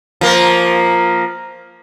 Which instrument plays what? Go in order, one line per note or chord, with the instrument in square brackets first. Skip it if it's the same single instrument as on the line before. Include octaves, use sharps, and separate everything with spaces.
[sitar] F3 A#3